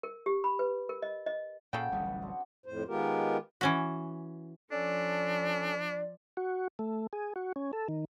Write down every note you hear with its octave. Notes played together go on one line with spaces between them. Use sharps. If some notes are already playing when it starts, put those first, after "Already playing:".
A#4
G4
B5
B4
A#4
D#5
D#5
A#2 C#3 A4 F#5 G5
D1 A1 G3 D4 C#5 D#5
B4
C4 D4 F#4
F2 A2 C5
D#3 G#3 B3 F4 G4 A#4
E3 C#4 F#4
F3 C#4 D4 A4 D5
F#4
A3
G#4
F#4
C#4
A4
D#3